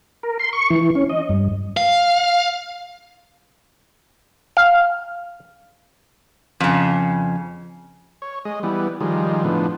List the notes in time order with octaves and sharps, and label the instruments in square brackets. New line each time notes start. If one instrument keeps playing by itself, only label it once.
[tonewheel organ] A#4
C6
C#6
E3
C#4
D#5
G2
[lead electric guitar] F5
[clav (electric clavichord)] F5
[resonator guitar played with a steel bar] F2 C#3
[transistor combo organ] C#5
G#3 D#5
E3 G3 B3
D#3 F3 G3 G#3
A2 D3 F3 B3